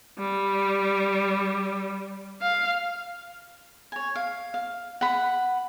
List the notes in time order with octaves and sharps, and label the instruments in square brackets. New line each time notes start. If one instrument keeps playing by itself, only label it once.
[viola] G3
F5
[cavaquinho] C#5 G#5
F5
F5
F#5 B5